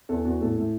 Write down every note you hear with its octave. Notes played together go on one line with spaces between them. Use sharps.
E2 A4
E2 F#4
A2 A4
A2